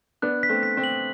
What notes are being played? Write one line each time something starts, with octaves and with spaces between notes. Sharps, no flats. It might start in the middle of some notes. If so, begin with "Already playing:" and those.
B3 D4 F#6
B6
A3 C4
B6
A3 C4
F#7